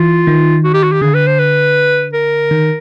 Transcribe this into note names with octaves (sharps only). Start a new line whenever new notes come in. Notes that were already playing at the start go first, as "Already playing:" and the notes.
Already playing: E3 F4
D#3
F#4
G4
F#4
G4
D3 G#4
B4
C5
B4
A#4
D#3